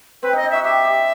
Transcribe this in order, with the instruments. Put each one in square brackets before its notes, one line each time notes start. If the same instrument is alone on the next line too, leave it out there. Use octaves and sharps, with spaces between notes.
[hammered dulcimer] C4 [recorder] B4
[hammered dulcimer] D#4 [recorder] D#5
[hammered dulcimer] D#4
[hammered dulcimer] F#4 [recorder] E5
[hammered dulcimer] G4 [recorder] E5
[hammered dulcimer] G4